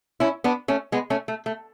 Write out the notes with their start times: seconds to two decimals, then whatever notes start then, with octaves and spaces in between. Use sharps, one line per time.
0.20 C#4 E4
0.44 B3 D4
0.68 A3 C#4
0.92 G#3 B3
1.10 A3 C#4
1.28 A3
1.46 A3